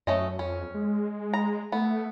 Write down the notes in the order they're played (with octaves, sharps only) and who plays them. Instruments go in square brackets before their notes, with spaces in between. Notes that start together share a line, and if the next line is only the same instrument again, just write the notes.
[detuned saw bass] F#2 [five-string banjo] A3 C#4 D#5
[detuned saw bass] F2 [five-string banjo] C#4
[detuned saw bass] G#3
[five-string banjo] A#5
[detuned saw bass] A3 [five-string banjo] B3